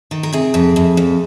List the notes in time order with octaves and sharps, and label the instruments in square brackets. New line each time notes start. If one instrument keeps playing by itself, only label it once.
[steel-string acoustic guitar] D#3
A#4
C3 G#4
F2
F2
F2